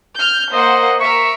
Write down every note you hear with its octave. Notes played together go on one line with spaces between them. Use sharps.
F6 G6
A#3 C5 D#5 F#5
A#4 E5 C#6